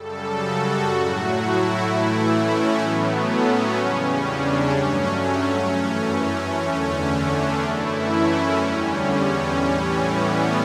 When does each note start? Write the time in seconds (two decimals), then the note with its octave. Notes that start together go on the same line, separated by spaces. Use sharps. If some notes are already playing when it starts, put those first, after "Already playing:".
Already playing: F#2 C#3 G3 A4
0.40 F#4
0.88 A2 F#3 A3
1.36 E4
1.85 A2 E3 A3
2.32 C#4
2.80 A2 F#3 A3 B3
3.29 C#4
3.77 E2 C#3 G3
4.25 D4
4.73 G2 F#3 A3 C#4
5.69 F#2 E3 A3
6.65 E2 D3 A3
7.13 D4
7.61 F#2 E3 A3 E4
8.10 C#4
8.57 E2 D3 G3
9.05 C#4
9.54 A2 E3 G3
10.01 B3